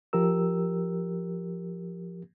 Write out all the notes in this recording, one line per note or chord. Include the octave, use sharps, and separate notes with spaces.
F3 G4 A#4 E6